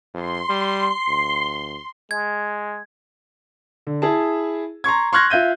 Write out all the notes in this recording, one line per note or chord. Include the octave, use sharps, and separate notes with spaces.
F2 C6
G3
D2
G#3 G#6
D3
E4 G#4 A5
A#5 C6 C#6 G#6
C6 C#6 F6 F#6 G#6 A#6
F4 E5 G6 D#7